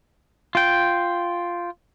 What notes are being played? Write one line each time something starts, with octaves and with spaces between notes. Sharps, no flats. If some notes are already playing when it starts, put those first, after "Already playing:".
F4 G5